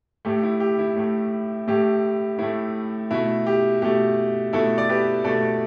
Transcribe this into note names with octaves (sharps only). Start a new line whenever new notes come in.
A2 A3 G4
E4
G4
E4
A2 A3
A2 A3 G4
A2 A3 E4
B2 A3 E4
G4
B2 A3 G4
B2 A3 E4 A4
D5
G4 B4
B2 A3 A4 D5